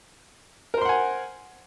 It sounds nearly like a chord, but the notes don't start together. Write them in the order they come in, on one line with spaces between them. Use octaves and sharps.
A#4 C5 C6 F#5 G#5